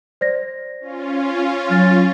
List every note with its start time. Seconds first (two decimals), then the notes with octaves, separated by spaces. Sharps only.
0.21 C5 D5 A#6
0.80 C#4 F4
1.71 F#3 F6 A6